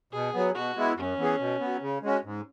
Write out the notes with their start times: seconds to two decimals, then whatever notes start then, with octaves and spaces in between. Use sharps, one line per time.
0.12 B2 G#4
0.33 F#3 B3
0.55 B2 F#4
0.76 G#3 B3 E4
0.97 F#2 C#4
1.18 E3 B3 G#4
1.40 B2
1.60 F#3 B3
1.82 C#3
2.03 G#3 C#4 F#4
2.24 G#2